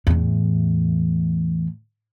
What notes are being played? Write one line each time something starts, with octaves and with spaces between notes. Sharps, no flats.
E2 A2